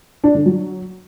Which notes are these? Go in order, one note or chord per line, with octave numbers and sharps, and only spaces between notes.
D4
D3
F#3